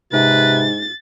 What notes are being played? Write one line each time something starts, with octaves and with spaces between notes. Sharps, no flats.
G#2 C3 B4 A6